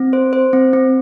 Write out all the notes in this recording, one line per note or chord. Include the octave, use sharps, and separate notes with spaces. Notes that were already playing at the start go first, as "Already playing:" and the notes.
Already playing: C4
C5
C5
C4
C4